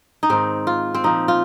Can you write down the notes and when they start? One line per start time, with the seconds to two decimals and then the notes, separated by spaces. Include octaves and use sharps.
0.23 D#4
0.30 G#2 D#3 C4
0.67 F4
0.94 C4
1.04 A#2 F3 D#4
1.28 F4